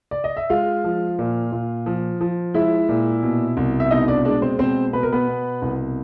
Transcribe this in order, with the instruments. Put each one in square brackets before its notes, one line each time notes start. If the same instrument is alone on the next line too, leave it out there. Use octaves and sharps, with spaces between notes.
[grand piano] D5
D#5
E5
G#3 F4 F5
F3
A#2
A#2
F3
F3
G#3 E4 E5
A#2
B2
C2
E5
B2 D#4 D#5
D4 D5
G#3 D4 D5
C4 C5
B2 C4 C5
B2 B4
A#4
B3 B4
B2
C2